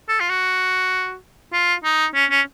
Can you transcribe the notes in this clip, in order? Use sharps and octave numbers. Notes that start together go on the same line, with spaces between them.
A4
F4
F#4
F4
D#4
C#4
C#4